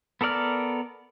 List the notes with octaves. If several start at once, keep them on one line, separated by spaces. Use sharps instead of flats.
B3 A4 A#4 D5 F6